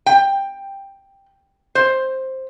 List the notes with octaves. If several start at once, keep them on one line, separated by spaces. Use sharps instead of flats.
G5
C5